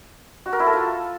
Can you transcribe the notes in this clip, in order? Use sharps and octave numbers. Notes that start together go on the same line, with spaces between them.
F#4
A#4
E4
A4
F4